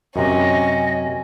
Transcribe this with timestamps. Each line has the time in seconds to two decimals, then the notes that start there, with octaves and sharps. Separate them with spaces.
0.16 F#2 C3 C#4 D#5 G#5